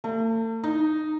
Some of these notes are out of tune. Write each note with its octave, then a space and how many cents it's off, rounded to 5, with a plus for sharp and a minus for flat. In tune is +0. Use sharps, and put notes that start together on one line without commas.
A3 +40
D#4 -10